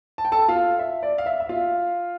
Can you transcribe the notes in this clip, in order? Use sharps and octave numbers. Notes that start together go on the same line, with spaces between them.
A5
G5
A4 A5
F4 F5
E5
D5
F5
E5
E5
F4 F5